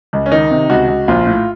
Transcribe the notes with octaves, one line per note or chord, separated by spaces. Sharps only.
C#2
C#4
D#3 D#4
C3
C#2 F#4
C#2
A#1 F4
A2